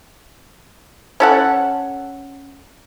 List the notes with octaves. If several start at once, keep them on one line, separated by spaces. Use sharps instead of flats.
C#4 A4 F#5